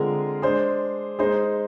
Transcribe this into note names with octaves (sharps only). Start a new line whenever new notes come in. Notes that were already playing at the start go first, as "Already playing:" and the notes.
Already playing: D3 G#3 C4 F4 G#4 A#4
G#3 D4 G#4 C5
G#3 D#4 G#4 C5